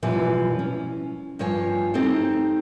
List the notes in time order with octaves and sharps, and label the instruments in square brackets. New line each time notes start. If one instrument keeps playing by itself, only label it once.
[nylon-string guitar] F#2 B2 E3 F3 G3 B4
C#4
G2 F3 C#5 G#5
C4 D#4 G4 A4 C5 C#5